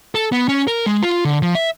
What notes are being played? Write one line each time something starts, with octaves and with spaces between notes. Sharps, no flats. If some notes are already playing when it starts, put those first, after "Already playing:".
A4
B3
C#4
A#4
G#3
F4
D3
F3
E5